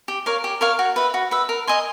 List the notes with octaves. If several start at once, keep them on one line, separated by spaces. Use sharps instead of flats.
G4
A#4 C#5 F5
G4
A#4 C#5 F5
F#4
B4 E5
F#4
B4 E5
A#4
D#5 G#5 C6